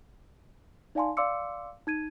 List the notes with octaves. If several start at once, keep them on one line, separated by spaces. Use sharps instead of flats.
D#4 D5 F5 G#5 A5 C6
D5 F5 C6 D6 E6 C#7
D#4 G#6 D#7